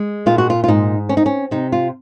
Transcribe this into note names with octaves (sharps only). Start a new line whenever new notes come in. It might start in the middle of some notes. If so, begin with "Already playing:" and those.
Already playing: G#3
A#2 F4
F#4
F4
F4
G#2 D#4
C4 C#4
D#4
C#4
C3 D#4
F4